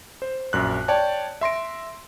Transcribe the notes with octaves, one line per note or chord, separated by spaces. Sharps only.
C5
A#1 F#2 F#6
C#5 D5 G5 A5
E5 C6 A#6 D7